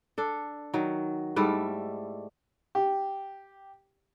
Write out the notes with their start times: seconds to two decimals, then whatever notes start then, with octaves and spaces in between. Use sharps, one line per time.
0.18 D4 A4
0.74 D#3 F#3
1.36 G#2 G3 A3 E4
2.75 G4